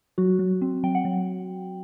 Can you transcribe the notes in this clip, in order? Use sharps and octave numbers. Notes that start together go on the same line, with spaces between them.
F#3 F#4
F#3
C4
F#3 G5
F#5
F#3